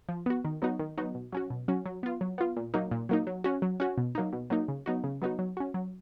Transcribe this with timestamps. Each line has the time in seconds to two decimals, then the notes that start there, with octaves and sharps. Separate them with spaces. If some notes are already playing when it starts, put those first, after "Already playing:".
0.09 F3
0.26 B3 F#4
0.45 D#3
0.62 F#3 B3 D#4 F#4
0.80 D#3
0.98 F#3 B3 D#4 F#4
1.15 B2
1.33 F#3 C#4 F#4
1.50 B2
1.68 F#3 C#4 F#4
1.86 F#3
2.03 B3 F4
2.21 F#3
2.38 B3 F4
2.57 A#2
2.74 F#3 A#3 D#4
2.91 A#2
3.09 F#3 A#3 D#4
3.27 F#3
3.44 C#4 F#4
3.62 F#3
3.80 C#4 F#4
3.98 B2
4.15 F#3 A#3 D#4
4.33 B2
4.50 F#3 A#3 D#4
4.68 C#3
4.86 F#3 B3 D#4 F#4
5.04 C#3
5.22 F#3 B3 D#4 F#4
5.39 F#3
5.57 C#4 F#4
5.74 F#3